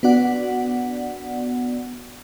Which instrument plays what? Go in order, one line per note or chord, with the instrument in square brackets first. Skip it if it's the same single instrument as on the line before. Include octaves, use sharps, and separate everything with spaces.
[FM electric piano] B3 D4 F#4 D5 F#5